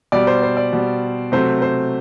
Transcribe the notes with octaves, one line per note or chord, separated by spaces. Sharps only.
B2 G3 D5
C5
C5
D5
B2 G3
C3 F#3 A3 C5
C5